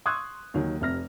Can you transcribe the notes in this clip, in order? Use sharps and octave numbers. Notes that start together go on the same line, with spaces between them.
C6 C#6 D#6 E6 F#6 G#6
D#2 D#3 F#3
F1 C3 F6 A#6